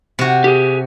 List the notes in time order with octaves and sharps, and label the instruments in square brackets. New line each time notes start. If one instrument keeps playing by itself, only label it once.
[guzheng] C3 F#4
[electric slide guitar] G4 G#4